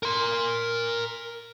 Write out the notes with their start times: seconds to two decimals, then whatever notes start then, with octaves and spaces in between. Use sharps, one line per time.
0.03 A#4 C6